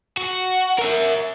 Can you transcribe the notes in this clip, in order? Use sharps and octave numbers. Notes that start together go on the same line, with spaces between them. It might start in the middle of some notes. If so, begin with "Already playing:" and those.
F#4
A#4 E5